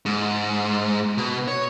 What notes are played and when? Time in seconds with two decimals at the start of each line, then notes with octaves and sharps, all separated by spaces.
0.06 G#2
1.18 B2
1.48 C#5